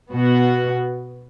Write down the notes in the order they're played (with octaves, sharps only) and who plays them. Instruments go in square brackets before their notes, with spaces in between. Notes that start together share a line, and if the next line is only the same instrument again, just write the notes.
[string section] B2 B3 F#4